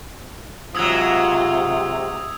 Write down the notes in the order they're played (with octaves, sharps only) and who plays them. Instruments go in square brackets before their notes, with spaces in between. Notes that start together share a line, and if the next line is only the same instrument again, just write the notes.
[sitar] G#2 F#3 [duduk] C3 [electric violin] F4 [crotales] D#6 E6 G#6